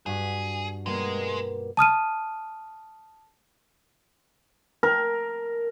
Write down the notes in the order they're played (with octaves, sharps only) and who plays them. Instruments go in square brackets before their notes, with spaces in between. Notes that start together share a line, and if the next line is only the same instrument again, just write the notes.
[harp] G2 F#4 B6 [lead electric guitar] G#4
[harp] B2 G3 A#3 [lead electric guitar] G#3
[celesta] A5 D#6 F6 D#7
[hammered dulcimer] A#4